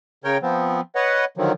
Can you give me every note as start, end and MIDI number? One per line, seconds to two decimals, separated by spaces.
0.24 0.37 49
0.24 0.37 70
0.24 0.37 73
0.24 0.37 79
0.42 0.81 53
0.42 0.81 59
0.42 0.81 60
0.95 1.25 71
0.95 1.25 73
0.95 1.25 75
0.95 1.25 78
1.37 1.52 50
1.37 1.52 51
1.37 1.52 53
1.37 1.52 54
1.37 1.52 60